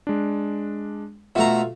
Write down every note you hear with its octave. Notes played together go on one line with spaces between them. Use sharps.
G#3 D4
B2 A3 F4 E5 F5 A#5